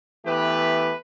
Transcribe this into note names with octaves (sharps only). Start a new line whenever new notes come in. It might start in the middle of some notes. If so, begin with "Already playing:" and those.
E3 A3 B3 G4 B4